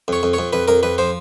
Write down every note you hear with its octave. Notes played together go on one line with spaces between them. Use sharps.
F2 C#5
F2
F2 C#5
F2 B4
F2 A#4
F2 B4
F3 C5